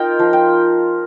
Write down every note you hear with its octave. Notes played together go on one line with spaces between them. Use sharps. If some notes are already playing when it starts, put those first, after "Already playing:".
Already playing: D#4 F4 A#4 G5
F3
G5